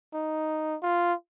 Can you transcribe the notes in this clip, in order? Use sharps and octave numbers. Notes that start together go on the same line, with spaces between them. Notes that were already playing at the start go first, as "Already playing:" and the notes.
D#4
F4